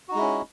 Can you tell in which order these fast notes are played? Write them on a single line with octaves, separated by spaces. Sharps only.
F#4 D#4 G#3 E4 C#4